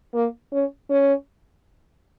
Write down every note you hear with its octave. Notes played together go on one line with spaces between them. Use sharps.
A#3
C#4
C#4